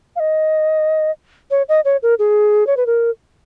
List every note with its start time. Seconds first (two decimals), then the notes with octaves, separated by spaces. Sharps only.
0.16 F5
0.20 D#5
1.51 C#5
1.69 D#5
1.85 C#5
2.03 A#4
2.19 G#4
2.67 C#5
2.77 B4
2.86 A#4